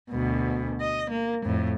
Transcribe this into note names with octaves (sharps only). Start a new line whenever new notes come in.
D2 B2
D#5
A#3
F2 A2